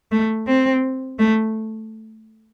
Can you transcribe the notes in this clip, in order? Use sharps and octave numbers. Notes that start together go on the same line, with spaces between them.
A3
C4
A3